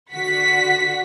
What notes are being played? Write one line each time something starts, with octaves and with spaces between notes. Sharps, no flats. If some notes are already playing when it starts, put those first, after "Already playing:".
D3 F#4 F#5 B6